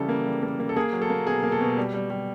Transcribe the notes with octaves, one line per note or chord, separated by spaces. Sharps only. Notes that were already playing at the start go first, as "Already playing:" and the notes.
Already playing: C#3 E3 G3 A4
A#3
G3
A#3
A#3
A4
A#3 G#4
F#3
A4
A#3
B2 G#4
A#3
A4
B2
G3
G3
G3